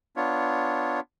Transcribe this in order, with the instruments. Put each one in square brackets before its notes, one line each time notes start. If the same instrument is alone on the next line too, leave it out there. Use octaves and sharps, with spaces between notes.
[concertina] B3 D4 F4 C#5